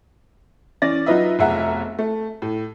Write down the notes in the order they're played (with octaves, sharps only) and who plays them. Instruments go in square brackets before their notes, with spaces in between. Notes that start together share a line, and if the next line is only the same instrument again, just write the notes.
[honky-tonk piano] E3 C#4 D5 A6 A#6
F#3 D#4 F4 B4 D#5 E5
F1 B1 G#4 E5 F#5 A#5
A3
A2